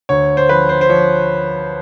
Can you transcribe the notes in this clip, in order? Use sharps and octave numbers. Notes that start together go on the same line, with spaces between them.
D2 C#5
C5
F3 B4
C5
C5
F3 C#5